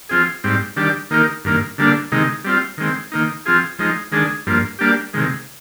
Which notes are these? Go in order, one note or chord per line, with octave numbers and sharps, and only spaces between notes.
F3 C4 F4 G#4
G#2 G3 C4
D#3 G3 D4 G4
D#3 A#3 D#4 G4 A#4
G2 D#3 A#3
D3 G3 A#3 D4
C3 D#3 G#3 D#4
G3 C4 F4
D#3 G#3 C4
D#3 A#3 D#4
F3 C4 F4 G#4
F3 G#3 D#4
D#3 G#3 D4 G#4
G2 F3 A#3
G3 A#3 D4 G4
C3 D#3 G#3